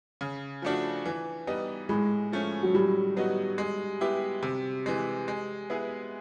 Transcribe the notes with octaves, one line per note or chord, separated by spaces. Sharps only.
C#3
F3 A3 D4 F#4
E3
G3 B3 D#4
A2 G#3
F3 A3 C#4
F#3
A2 G3
F#3 B3 D#4 F#4
G#3
B3 E4 G4
C3
E3 G#3
G#3
B3 E4 G#4